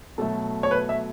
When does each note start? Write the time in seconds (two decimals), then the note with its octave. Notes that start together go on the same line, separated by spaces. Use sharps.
0.18 B2 F#3 A3 A4
0.63 C#5
0.71 B4
0.89 E5